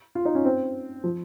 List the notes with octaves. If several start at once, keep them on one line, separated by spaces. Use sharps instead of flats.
F4
D#4
C#4
C4
F3